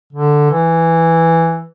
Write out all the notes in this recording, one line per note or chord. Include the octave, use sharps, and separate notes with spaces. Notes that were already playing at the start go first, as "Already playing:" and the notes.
D3
E3